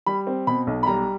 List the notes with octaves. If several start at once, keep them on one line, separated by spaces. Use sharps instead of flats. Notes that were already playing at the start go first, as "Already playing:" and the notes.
G3 B5
C4
B2 B5
B1
B5
G3 A#5